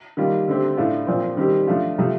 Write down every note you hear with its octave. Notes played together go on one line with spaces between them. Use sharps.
D#3 G3 A#3 F4
D3 A3 C4 G4
A2 A3 D4 F4
A#2 F3 C4
D#3 G3 C4 G4
F3 A3 D4 F4
C3 F3 A3